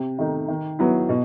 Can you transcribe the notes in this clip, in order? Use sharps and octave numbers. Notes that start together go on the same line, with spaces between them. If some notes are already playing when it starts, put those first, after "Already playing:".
Already playing: C3
D#3 A3 D#4
D#3
F#3 B3 E4
B2